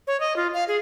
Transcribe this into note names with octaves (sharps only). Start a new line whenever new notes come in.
C#5
D#5
F4
F5
G#4